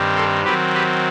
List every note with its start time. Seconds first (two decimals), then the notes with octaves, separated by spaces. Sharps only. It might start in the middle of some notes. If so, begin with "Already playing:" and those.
Already playing: G2 D#3 G3 C4
0.15 A4 C5
0.44 D#3 F#3 C4 G4 B4
0.74 G4 B4